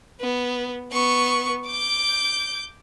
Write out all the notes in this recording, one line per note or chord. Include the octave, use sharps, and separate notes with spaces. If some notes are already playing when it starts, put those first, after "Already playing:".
B3
B3 C#6
D6 G6